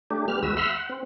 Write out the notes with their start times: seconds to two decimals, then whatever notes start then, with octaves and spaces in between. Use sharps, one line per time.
0.11 A3 D4 G4
0.28 G3 B3 G4 F6
0.43 D#2 G#3 F#4 B4 E6
0.57 E5 F#5 B5 C6 E6 F6
0.73 F#5
0.89 C4